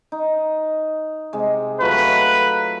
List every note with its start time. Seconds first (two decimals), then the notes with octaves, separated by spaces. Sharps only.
0.12 D#4
1.33 C3 G#3
1.81 F#3 A3 F4 B4